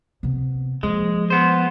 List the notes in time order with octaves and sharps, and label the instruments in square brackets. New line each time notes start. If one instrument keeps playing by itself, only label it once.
[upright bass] C3 B3
[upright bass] F3 A#3 [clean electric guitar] G#3
[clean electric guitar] B3 C5